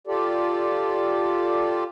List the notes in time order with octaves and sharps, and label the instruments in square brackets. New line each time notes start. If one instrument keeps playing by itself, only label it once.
[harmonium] F4 G4 A4 D5